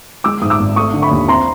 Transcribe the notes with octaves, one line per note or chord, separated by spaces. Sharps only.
G#3 D6 E6
G#2 D#6
D6 E6
G#1
A3 C#6 D#6
D3
B5 C#6
D#2
C4 A#5 C6